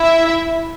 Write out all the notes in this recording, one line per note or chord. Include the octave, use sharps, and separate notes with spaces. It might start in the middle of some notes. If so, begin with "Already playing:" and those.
Already playing: E4 E5